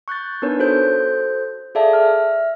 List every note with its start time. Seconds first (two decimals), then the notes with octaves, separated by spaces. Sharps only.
0.08 C#6 F#6 G6 A6
0.42 B3 D4 D#4 A#4 B4 C#5
0.59 F#4 A4 C5 G6
1.75 G#4 A4 D5 E5 F5 A5
1.93 E5 F6